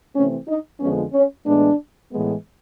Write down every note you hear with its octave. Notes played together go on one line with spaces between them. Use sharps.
C3 E3 A3 C4 C#4
D#4
F2 D3 F3 G#3 B3 C#4
C#4
A2 E3 G#3 B3 D4
A2 E3 G#3 B3